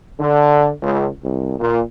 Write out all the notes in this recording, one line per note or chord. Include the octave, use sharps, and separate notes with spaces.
D3
C#2
C2
A#2